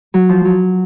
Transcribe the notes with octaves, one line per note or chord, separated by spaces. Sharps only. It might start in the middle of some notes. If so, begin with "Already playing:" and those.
F#3
F3
F#3